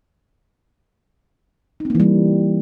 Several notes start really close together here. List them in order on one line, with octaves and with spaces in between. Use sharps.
D#4 C4 A#3 E3 G3